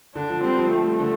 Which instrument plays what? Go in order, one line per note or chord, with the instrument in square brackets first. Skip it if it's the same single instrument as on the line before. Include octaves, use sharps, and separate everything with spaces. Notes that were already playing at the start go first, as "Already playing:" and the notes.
[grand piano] D3 [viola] D4
[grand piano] F3
[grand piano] G3 [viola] C4
[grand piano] F3
[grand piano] G3 [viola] A3
[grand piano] D3